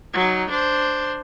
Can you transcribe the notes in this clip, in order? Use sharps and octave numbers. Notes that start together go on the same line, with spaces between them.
F#3 D#4
D4 C5